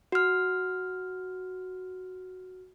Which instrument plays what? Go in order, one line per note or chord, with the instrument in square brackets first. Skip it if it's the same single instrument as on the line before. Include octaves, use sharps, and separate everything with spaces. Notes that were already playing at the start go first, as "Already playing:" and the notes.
[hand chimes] F#4 F6